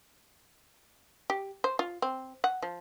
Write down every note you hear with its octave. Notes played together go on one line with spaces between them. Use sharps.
G4
C5
F4
C4
F#5
F3